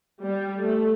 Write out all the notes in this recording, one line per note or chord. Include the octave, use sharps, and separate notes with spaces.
G3
A3